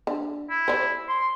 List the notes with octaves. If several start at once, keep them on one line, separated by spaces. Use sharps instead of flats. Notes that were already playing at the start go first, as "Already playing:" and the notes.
D3
E4
C5 D5
C6